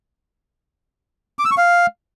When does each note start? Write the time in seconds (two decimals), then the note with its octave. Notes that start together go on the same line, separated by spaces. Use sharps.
1.39 D6
1.45 E6
1.51 C#6
1.57 F5